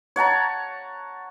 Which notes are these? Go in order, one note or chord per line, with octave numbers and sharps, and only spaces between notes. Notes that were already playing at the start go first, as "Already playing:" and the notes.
C#5 F#5 A5 A#5